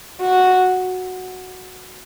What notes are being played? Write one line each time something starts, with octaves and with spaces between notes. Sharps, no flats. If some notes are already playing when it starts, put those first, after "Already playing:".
F#4